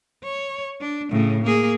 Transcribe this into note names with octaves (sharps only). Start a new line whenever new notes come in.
C#5
D4
A2 C#3
A#3 G#4